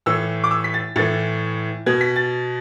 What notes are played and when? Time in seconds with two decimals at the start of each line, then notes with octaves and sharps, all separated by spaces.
0.06 A2 E3 E6
0.44 D6
0.51 E6
0.64 B6
0.74 A6
0.96 A2 E3 A6
1.86 B2 G#6
2.01 B6
2.16 A6